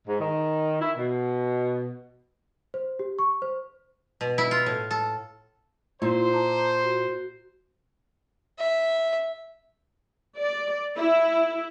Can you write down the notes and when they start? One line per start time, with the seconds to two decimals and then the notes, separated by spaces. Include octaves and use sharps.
0.08 G#2
0.21 D#3
0.81 E4
0.98 B2
2.74 C5
2.99 G4
3.19 C#6
3.42 C5
4.21 B2
4.38 E4
4.51 F4
4.66 A2
4.91 A4
6.02 A#2 E4 F4 C5 C6
6.33 A5 A#5 D6
6.84 F#4
8.59 E5
10.39 D5
10.96 E4